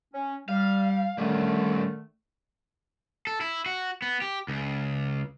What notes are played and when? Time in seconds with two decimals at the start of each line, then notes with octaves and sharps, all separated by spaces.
0.14 C#4
0.49 G3 F5
1.18 D3 D#3 G3 A3 C#4
3.27 A4
3.41 E4
3.66 F#4
4.02 B3
4.22 G4
4.48 C#2